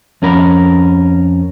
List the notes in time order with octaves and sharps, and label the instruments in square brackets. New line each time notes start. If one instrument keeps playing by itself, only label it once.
[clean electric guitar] F2 C#4 A#4 B5